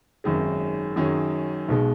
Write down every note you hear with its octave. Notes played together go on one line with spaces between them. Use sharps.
G#1 F#2 D#3 G#3
F#2 D#3 F#3 C#4 G#4
B1 B2 G#3